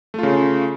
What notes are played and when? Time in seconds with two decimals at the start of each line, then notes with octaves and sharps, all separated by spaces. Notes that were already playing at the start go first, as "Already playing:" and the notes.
0.14 A3
0.19 F4
0.23 C#3